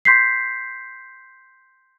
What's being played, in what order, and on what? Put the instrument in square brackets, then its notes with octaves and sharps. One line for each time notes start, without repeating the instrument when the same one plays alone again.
[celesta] C6 G6 B6 C7